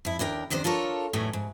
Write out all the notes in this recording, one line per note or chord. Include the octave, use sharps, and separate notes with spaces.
F2 E4
D#2 D4 A#4 G5
E2 C3 D#3 D4 C5
D4 F4 A4 A#4 C#5
E2 A2 D#3 F#3 A3
G#2